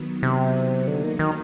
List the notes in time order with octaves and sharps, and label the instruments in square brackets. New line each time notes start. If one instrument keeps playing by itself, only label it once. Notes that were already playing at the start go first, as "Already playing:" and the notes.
Already playing: [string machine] D#3 F#3 B3
[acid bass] C3
[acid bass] D3 [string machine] F#3 A#3 D#4
[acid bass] D#3
D#3